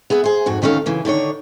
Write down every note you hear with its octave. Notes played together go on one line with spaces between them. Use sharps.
B3 G#4 B4 E5
G#4 C5
F2 G#2 F#4 C#5
D2 D#3 C#4 E4 A4 F5
F#2 C#3 E3
D3 D#3 D4 C#5